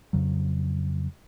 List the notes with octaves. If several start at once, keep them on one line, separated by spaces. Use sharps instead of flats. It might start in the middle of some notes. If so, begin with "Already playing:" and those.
F2 C#3 F#3